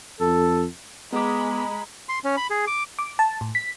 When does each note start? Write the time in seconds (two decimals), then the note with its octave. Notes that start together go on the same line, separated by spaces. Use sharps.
0.20 F2 A4
1.13 G#3 B3 A#5 B5 D6
2.09 C6
2.24 C#4
2.37 B5
2.50 G#4
2.67 D6
2.99 D6
3.19 A5
3.41 A2
3.55 B6